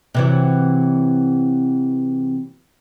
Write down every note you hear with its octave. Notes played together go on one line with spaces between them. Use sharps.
C3 E3 F#3